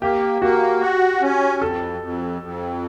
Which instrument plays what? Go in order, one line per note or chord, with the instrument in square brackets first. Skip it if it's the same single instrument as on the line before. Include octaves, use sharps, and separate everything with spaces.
[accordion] A#3 [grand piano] G4
[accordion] A#3 [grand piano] F#4
[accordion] F#4
C#4
[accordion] F2 [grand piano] A4
[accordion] F2
F2